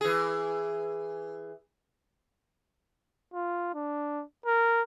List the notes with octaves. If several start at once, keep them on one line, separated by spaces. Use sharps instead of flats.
E3 G#4
F4
D4
A#4